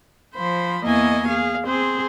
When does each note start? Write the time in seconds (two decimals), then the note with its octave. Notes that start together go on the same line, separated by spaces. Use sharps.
0.35 F3 C5 B5
0.84 E2 A#3 E4 D#5 G#5 C#6
1.28 G#4 F5
1.66 C4 G#4 C5